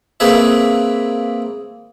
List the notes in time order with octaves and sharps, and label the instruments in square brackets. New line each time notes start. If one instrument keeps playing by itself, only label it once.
[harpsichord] A#3 C4 G#4 B4 E5